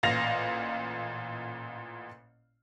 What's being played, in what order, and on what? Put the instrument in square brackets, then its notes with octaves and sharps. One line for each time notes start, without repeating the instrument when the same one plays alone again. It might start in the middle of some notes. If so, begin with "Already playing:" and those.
[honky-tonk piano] A1 A#2 F5 A#6 F7